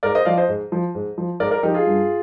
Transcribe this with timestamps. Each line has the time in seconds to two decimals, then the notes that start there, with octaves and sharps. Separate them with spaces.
0.03 G#2 A#4 D5
0.15 C5 D#5
0.25 F3 D5 F5
0.37 C5 D#5
0.48 G#2
0.72 F3
0.95 G#2
1.18 F3
1.40 G#2 A#4 D5
1.51 A#4 D5
1.63 F3 D#4 G4
1.74 F4 G#4
1.87 G2